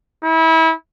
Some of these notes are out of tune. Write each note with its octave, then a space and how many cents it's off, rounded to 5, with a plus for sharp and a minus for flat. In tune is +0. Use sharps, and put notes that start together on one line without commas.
E4 -30